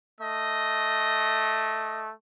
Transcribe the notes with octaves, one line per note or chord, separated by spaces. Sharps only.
A3 D#5